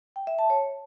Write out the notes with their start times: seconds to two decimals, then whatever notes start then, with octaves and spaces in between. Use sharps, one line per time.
0.16 G5
0.27 E5
0.39 A5
0.50 C#5